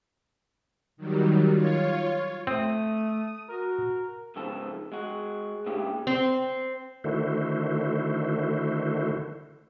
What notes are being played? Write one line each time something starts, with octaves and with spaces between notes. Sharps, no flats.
D#3 F#3 G3
F4 C#5
A3 C4 D#6
F#4 A#4
F2 G#2 C#3 F3 B3 A4
G#3 F#4
A#2 G#3 C#4 D4 E4 G4
C4
D3 D#3 A3 E4 F#4 C5